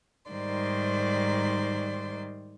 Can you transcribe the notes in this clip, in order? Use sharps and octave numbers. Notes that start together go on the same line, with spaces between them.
G#2 D#3 G3 C5 D5 C6